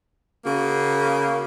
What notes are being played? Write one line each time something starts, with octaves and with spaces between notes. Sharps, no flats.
C#3 A#3 F#4